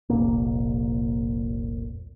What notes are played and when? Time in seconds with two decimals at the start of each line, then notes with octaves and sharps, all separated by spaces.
0.09 F1 C2 A#2 A#3